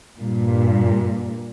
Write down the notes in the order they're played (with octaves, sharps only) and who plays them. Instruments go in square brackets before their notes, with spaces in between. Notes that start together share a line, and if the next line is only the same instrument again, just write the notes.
[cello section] G2 A#2